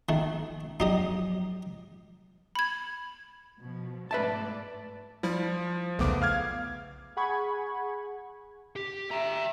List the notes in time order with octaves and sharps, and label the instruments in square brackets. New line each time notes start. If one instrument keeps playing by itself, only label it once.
[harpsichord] D#3 A3
[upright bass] F3 F#3 [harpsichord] D#4 G4 D#5
[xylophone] B5 G#6
[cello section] B2 F3
[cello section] G#2 A3 D5 [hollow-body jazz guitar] B4 E5 A5
[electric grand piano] F3 [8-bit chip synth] G3 E4
[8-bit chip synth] B1 E2 C#3 [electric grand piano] A3 B3 D6
[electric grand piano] F5 F6 G#6
[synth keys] G#4 F#5 G#5 B5 C#6 G#6
[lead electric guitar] G4
[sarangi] E5 [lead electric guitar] G5 A#5